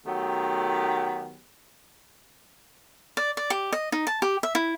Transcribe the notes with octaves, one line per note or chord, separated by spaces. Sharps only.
D#3 F#3 A3 B3 G4
D5
D5
G4
D#5
D#4
A5
G4
E5
E4